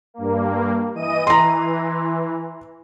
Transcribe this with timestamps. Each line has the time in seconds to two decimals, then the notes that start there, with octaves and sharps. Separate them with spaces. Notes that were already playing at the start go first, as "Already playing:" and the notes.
0.14 G2 A#3
0.94 E3 D#5 D#7
1.27 E3 A#5 C6